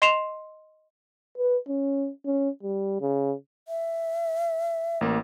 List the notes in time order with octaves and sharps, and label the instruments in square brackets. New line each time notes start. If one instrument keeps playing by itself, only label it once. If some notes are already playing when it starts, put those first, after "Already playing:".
[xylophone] D#5 C6 C7 E7 F7
[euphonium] B4
C#4
C#4
G3
C#3
[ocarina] E5
[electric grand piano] A1 A#3